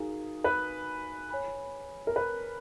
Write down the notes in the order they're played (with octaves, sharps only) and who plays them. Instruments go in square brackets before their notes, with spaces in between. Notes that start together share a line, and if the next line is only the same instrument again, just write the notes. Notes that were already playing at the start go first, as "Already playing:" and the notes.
Already playing: [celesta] D#4 F#4 A#4 F5 A#5 [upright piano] G#4
[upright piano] B4
[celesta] C#5 G#5 B5
[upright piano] A#4
B4